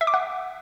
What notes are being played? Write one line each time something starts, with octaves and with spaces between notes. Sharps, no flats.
E5
D6
F#5